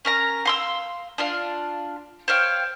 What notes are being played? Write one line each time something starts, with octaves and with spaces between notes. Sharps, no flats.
C#4 A#4 A#5
F5 C6 E6
D4 F4 F5
C5 C#5 F5 G5